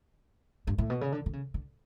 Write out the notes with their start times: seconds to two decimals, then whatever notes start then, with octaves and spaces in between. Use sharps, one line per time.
0.67 G2
0.78 A2
0.90 B2
1.01 C#3
1.12 D3
1.26 D3
1.33 C#3
1.54 D3